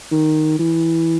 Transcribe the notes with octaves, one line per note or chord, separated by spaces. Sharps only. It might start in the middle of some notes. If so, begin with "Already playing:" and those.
D#3
E3